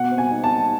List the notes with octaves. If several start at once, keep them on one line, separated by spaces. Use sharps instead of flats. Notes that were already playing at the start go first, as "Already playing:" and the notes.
Already playing: B2 F#5
C4
G#5
D#4
A5
D#4